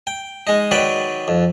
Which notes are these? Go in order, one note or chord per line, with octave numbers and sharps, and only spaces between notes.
G5
G#3 D#4
D#3 F#3 B4 D5 G5
F2